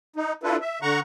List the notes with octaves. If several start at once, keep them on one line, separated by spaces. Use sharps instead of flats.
D#4
D4 E4 F4 A4 B4
E5
D3 F#5 A#5 C#6